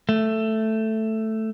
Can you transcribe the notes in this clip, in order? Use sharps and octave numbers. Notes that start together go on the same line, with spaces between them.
A3